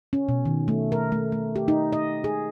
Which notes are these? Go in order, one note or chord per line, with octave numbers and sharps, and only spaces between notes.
C#4
B2
D#3
A3
A#4
A3
A3
G4
D#4
D#5
G#4